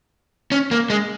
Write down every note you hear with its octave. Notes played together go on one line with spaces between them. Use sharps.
C#4
A#3
G#3